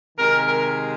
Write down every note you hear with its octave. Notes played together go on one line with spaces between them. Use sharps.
C3 D#3 G#3 A#4
A#4